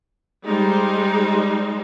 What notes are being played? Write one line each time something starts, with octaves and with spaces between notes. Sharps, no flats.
G3 G#3 D#4 C5